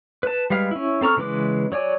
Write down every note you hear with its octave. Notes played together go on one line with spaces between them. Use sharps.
B4 A5
G3 G#3 B4 F5
C#4 E4
C4 A4 A#5 C#6 F6
C#3 E3 G#3 B4 D6
F#3 C#5 D5 G#5